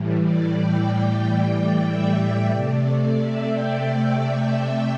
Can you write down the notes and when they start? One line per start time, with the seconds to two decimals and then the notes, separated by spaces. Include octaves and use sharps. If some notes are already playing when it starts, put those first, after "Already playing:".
Already playing: A2 E3 G3
0.22 D5
0.54 G5
1.84 E5
2.49 C3 A3 D5
3.14 E5
3.47 G5
4.45 E5